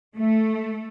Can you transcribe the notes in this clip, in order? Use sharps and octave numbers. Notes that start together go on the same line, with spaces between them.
A3